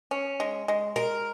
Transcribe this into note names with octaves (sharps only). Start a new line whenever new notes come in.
C#4
G#3
G#3
G#3 A#4